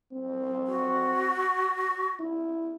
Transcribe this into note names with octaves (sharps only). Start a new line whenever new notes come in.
C4
F#4
E4